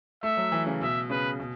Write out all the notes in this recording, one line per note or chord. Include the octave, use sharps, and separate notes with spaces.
A3 E5
F#3
E3
C#3
B2 E5
C#3 B4
B2